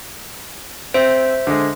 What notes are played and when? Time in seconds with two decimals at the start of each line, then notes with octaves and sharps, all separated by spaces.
0.94 C4 C5 E5
1.47 D3 G#3